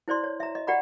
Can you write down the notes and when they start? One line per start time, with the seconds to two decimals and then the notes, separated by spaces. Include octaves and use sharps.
0.08 E4 C5 D5 C6
0.24 C#5
0.40 E5 A#5
0.55 D#5
0.67 G4 D5 F#5 A#5 B5